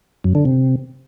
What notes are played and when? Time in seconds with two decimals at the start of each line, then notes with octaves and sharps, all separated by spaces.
0.24 F#2
0.35 D3
0.45 C3